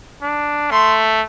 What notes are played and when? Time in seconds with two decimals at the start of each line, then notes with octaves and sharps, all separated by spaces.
0.22 D4
0.71 A3 C6